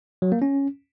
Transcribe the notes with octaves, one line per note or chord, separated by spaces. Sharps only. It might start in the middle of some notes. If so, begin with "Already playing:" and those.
F#3
A#3
C#4